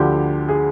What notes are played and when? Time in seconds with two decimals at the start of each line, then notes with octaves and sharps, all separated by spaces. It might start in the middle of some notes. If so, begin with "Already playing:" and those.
Already playing: D2 D3 F3 G4
0.49 G#4